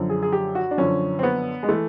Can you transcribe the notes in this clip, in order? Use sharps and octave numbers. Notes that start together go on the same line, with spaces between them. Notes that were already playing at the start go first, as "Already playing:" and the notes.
Already playing: F#2 D3 F3
G#4
G#4
G4
F#4
D4
F#2 D3 F3 C#4
C4
B3
G#3
E3 A3